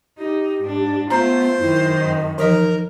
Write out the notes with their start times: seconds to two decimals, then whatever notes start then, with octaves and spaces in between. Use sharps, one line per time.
0.18 D#4 G4
0.62 G#2 D4
1.10 A3 B3 F4 C5 A#5
1.58 F#2 D#3 E4
1.98 D#5
2.38 E3 F3 D#4 A#4 D#5